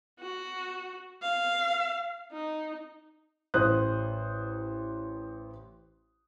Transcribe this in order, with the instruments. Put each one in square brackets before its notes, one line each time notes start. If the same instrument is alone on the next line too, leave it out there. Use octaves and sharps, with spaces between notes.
[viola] F#4
F5
D#4
[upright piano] A1 C5 D#6 F#6